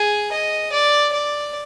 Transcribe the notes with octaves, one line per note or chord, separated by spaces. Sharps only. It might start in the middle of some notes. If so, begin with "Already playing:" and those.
Already playing: G#4
D#5
D5
D5